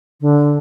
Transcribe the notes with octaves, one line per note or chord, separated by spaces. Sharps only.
D3